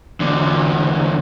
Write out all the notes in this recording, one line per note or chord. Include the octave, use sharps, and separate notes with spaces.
E2 D3